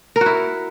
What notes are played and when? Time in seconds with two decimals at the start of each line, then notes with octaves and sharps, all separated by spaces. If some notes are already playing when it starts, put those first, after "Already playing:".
0.16 A#4
0.21 F#4
0.26 E4